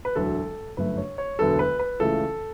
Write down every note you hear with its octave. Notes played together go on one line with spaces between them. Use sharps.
B4
E1 D2 D3 F#3 A4
G1 F#2 D3 A3 B4
C#5
C#5
E1 D2 D3 F#3 B3 A4
B4
B4
C#2 C#3 E3 A3 A4